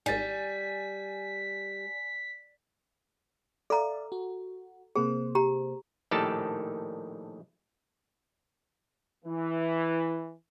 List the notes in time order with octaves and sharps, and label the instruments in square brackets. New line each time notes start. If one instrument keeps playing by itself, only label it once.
[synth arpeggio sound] G#1 G#2 [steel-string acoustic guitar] G3 [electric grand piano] G#5 A6 [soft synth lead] B6
[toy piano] A4 A#5 [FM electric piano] D5 E5 F5
[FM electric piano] F#4
[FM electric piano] C3 A#3 C5 [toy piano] G#4
[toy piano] G4 A#5
[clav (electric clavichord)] A#1 A2 D#3 G4 A4 A5
[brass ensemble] E3